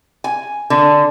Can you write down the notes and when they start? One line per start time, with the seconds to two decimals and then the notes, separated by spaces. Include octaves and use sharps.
0.24 G#5
0.70 D3